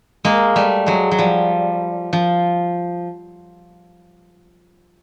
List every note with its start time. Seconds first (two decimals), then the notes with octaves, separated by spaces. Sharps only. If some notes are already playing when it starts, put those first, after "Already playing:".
0.25 G#3 A#3
0.56 G3 A3
0.86 F#3 G#3
1.11 F#3
1.19 F3 G3
2.13 F3